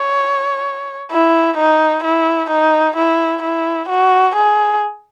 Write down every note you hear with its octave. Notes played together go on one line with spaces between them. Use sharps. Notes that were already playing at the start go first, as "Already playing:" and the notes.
Already playing: C#5
E4
D#4
E4
D#4
E4
E4
F#4
G#4